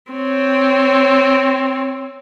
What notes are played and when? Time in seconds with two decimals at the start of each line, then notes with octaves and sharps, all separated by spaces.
0.12 C4 C#5